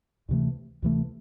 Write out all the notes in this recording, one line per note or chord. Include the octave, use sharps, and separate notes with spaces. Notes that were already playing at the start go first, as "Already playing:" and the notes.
D2 C3 E3 A3
D2 C3 E3 A3